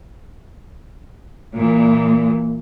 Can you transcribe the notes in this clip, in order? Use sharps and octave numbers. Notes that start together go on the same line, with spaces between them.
A#2 E3